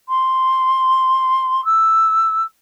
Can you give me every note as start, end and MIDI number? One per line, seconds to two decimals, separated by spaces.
0.09 1.64 84
1.65 2.44 88